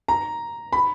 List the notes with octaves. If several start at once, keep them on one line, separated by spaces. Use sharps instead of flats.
A#5
B5